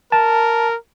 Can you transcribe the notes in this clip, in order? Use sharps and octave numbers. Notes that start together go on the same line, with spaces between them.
A#4 A5